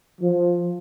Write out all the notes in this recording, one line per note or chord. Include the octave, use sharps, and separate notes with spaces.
F3